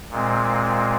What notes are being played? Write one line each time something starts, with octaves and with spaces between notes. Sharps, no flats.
A#2 G#3 C4